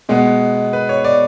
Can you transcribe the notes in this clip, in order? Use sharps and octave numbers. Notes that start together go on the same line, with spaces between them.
B2 G#3 B3
B4
C#5
D5